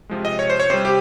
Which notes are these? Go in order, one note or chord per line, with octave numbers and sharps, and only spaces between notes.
C3 F3 G#3
D#5
C#5
C5
C#5
C3 G3 C5
G4